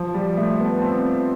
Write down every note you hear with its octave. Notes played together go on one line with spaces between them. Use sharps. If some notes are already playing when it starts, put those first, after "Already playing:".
Already playing: F3
G3
A3
B3
C4